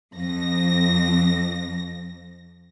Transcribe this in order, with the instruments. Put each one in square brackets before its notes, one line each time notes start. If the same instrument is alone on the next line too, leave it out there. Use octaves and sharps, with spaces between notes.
[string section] F2 A#6